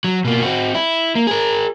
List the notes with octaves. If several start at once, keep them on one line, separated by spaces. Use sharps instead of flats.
F#3
B2 A#3
C4 F#4
E4
A#3
G#4 A#4